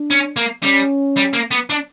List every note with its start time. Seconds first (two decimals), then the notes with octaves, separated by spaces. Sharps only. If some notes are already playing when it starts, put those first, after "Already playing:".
Already playing: D4
0.10 C#4
0.36 A#3
0.63 G3 C#4
1.17 G3
1.33 A#3
1.51 B3
1.70 D4